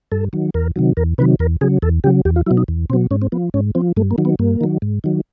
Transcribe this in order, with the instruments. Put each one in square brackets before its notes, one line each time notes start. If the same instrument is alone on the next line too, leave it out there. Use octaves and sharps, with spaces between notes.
[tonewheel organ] G2 A4
D#3 F#3
E2 A#4
C3 D#3 F#3
E2 A#4
C3 D#3 F#3 B4
E2 A#4
C#3 F#3 G#4
E2 A4
C#3 F#3 G4
E2 G4
F4
B2 F#3 E4
D#4
E2
B2 C4
F#3
G#2 C#4
C4
F3 B3
G#2 C#4
F3 C4
G2 A3
A#3
D#3 F#3
B3
G2 A#3
D#3 F#3
G#2
D#3 F#3